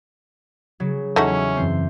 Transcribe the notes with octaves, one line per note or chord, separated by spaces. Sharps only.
C#3 F#3
E2 A3 C#4 D#4 F#4 E5
F#2 E3 C4 C5